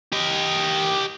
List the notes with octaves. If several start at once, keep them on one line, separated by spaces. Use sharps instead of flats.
G4 D#5